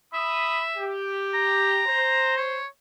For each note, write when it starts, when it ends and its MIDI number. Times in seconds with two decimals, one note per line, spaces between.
0.14 0.94 76
0.14 0.62 83
0.14 0.62 87
0.78 1.83 67
1.34 2.34 82
1.87 2.59 72
2.37 2.67 73